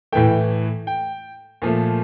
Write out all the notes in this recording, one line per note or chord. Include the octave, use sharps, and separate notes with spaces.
A2 E3 A3 G5
G5
A#2 F3 A3